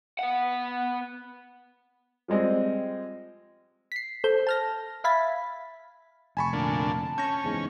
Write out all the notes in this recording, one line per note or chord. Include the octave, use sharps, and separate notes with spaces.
B3 F#5
F3 G3 G#3 C4
B6 C7
A4 C5 G6
A5 F6 A#6
E5 F5 B5 G#6 A6 B6
F1 G#5 A5 B5 C#6
A#2 D3
C#4 G6 A#6
F#1 E2 G#2